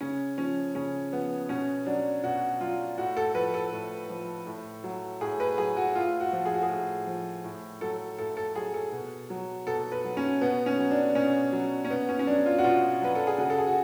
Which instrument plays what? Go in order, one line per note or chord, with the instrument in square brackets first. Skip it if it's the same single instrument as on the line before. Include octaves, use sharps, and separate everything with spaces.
[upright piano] C#3 C#4
F3 C#4
C#3 C#4
F3 B3
B2 C#4
F#3 D4
B2 F#4
F#3 F4
A2 F#4
A4
F3 B4
A4
A2
F3
A2
F#3
A2 G#4
B4
F#3 G#4
F#4
A2 F4
F#4
F3
G#4
F#4
G#4
A2
F3
A2
F#3 A4
A2 A4
A4
F#3 G#4
A4
B2
F#3
B2 A4
B4
F#3
C#4
B2 B3
C#4
F#3
D4
B2 C#4
F#3
C#4
B2 B3
C#4
C#4
F#3 D4
F4
F#4
B2 F4
F#3 B4
A4
G#4
C#3 F#4
A4
G#4
F#4